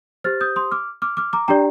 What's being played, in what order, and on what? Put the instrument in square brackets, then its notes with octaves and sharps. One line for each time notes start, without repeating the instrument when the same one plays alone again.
[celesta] G4 C5 F6 A6
D#6 G6
C6 D#6
D6 F6
D6 F6
D6 F6
A#5 D6
D4 G4 D5 G5 A#5